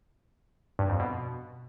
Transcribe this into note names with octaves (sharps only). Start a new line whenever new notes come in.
G2
F2
B2